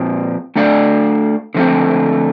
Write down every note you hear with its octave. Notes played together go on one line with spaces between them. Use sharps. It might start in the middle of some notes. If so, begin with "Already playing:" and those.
Already playing: A#2 F3 C4
A3 D4 A4 D5 F5
D3 F3 A3 C4